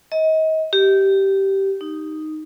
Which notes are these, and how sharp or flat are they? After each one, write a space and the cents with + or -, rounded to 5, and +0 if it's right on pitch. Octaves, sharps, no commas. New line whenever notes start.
D#5 +30
G4 -15
D#4 +0